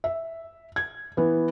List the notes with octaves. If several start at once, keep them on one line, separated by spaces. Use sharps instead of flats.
E5
G#6
E3 B3